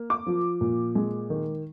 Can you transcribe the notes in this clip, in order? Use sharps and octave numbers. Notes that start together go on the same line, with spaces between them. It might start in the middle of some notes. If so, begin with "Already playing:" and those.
Already playing: A#3
D6
F3
A#2
G#3
D#3